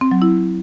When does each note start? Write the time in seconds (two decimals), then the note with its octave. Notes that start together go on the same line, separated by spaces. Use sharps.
0.01 C4
0.11 F#3
0.22 E4